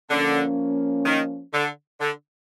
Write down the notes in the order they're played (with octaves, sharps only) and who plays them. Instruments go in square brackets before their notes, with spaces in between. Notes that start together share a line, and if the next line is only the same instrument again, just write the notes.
[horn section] D3 [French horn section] F3 A#3 C#4
[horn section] D#3
D3
D3